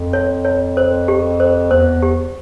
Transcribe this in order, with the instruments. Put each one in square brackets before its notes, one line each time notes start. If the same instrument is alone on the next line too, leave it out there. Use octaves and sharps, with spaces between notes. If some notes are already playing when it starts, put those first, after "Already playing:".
Already playing: [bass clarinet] F2
[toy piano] C#5
C#5
C5
G4
C5
[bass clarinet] E2 [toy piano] C5
[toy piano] G4